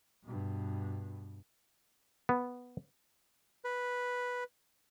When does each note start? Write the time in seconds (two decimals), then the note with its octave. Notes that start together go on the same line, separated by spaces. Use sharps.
0.25 G2 B2
2.29 B3
3.64 B4